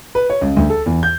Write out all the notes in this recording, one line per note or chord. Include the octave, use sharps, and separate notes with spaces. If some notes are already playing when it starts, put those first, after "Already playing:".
B4
C#5
C#2
D2
A4
E2
G6